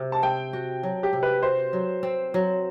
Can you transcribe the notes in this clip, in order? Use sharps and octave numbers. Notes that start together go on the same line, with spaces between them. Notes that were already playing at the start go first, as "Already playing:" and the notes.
Already playing: C3
A5
C4 G5
F#4
F#3
G4
C3
B4
F#4 C5
F#3
C4
F#3